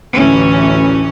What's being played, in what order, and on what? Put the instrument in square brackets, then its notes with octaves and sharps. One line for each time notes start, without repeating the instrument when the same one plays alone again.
[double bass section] A1 D2 E3 [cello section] C#4